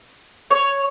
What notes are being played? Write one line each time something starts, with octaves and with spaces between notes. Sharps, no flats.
C#5